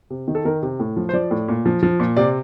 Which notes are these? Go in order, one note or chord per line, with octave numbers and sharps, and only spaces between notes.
C3
D#3
A4
D#3 A#4
C3
A2
F3
C5
F3 D5
A2
A#2
F3
F3
A#2
C3 D5